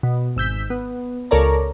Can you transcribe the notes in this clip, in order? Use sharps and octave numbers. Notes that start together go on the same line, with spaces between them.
B2
G#1 E6 G6 B6
B3
C#2 A4 A#4 C#5 D5 A#5